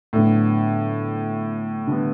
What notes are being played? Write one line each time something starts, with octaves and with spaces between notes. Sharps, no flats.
A2 D3 F#3 B3 D4
D3 G3 B3